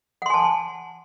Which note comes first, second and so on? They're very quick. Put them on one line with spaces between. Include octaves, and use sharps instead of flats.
F#5 C6 G#5 A5